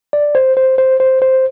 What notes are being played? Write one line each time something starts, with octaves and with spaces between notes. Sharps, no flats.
D5
C5
C5
C5
C5
C5